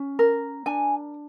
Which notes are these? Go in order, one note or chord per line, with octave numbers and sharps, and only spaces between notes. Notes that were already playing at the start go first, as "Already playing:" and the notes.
Already playing: C#4
A#4
D4 G#5